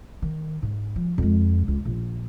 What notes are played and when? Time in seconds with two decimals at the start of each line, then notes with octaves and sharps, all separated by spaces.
0.22 D#3
0.63 G#2
0.96 F3
1.18 F2 G#3
1.68 C#2
1.85 A#1